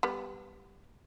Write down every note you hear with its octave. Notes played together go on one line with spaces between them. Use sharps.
G3 B3